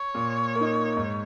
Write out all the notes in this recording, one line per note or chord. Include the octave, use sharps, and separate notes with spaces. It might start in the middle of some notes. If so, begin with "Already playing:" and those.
Already playing: C#5
A#2
A#3
D#4
G#2